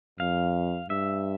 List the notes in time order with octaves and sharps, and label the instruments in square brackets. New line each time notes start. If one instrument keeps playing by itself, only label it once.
[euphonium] F2 [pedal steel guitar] F5
[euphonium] G2 [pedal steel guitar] E5